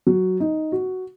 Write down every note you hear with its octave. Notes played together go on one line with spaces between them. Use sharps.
F#3
D#4
F#4